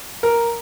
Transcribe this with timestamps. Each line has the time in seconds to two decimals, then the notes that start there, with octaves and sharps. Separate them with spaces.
0.23 A#4